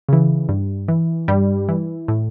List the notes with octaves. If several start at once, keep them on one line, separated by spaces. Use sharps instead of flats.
C#3 E3
G2
E3
G2 G3
E3
A2